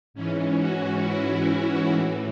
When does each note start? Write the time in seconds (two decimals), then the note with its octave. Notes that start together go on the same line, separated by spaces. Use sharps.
0.14 G#2 E3 C#4
0.58 F#4
1.02 E4
1.89 A2 E3